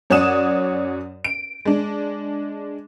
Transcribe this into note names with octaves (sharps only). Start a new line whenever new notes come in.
F#2 C#5 D5 F#5 D#6 E7
D7
G#3 D4